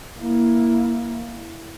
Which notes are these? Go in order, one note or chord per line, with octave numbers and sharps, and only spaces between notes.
A#3 E4